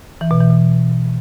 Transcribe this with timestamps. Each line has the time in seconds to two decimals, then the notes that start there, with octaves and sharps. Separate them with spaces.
0.21 E3
0.31 B2
0.40 E3
0.50 B2